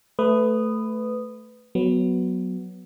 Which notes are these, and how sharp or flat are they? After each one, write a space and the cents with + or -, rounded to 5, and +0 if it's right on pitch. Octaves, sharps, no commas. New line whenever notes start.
A3 +0 B4 +15 D#6 -10
F#3 +0 B3 +0